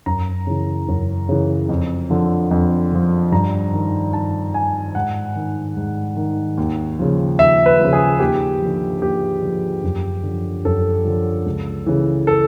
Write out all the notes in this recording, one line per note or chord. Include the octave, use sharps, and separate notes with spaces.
F#2 A#5
C#3 E3
F#2
C#3 E3
F2
D3 F3
F2
D3 F3
G2 A#5
D#3
G2 A5
D#3 G#5
G#2 F#5
D#3
G#2
D#3
D#2
C#3 F3
D#2 E5
B4
C#3 F3
G#4
D#2 G4
D3 F3
D#2 G4
D3 F3
F#2
D3 F3
F#2 A4
D3 F3
C#2
C#3 E3
A4